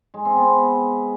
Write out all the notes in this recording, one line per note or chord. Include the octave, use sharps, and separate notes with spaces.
G#3
C4
B3